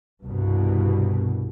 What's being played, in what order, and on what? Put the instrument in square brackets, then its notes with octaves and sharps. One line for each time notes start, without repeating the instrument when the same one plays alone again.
[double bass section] C2 G2 B2